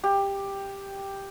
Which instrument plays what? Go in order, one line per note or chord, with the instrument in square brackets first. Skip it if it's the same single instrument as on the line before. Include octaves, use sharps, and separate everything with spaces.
[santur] G4